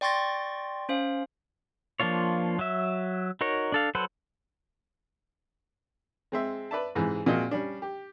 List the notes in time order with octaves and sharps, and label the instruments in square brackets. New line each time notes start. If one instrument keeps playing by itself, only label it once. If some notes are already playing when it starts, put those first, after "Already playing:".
[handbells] D5 G5 C6 C#6 A6 A#6
C#4 C5 F5
[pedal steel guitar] F3 A#3 D4 F4 C#5
F#3 E5
D#4 F#4 A#4 C#5
D4 A4 F5
F#3 A4 B4 C5 F#5
[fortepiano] G#3 C4 E5
B4 D5 E5 A5
G#2 C3 E3 G#4
A#2 F3 G#3 C4 F#4 D#5
G3 C#4 D4
G4